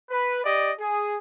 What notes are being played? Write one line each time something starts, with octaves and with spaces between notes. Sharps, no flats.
B4
G4 D5 D#5
G#4